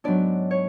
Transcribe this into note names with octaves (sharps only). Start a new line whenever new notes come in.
G#2 F#3 B3 D4 D5
C#5